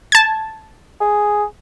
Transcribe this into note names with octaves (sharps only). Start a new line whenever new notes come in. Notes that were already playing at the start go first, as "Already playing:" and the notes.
A5 G#6
G#4